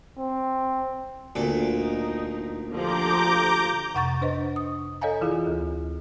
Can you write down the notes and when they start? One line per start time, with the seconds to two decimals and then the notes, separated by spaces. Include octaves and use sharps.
0.18 C4
1.36 D2 A#2 A4
1.76 D#4
2.73 D3 F3 G4 A#5 D6 G6
3.95 F2 C3 F#5 A#5 C#6 A6
4.21 D4 B4 C5 D#5
4.56 D#6
5.01 A4 C#5 D#5 F5 G#5 A#5
5.21 E3 E4 F4 G#4
5.47 D2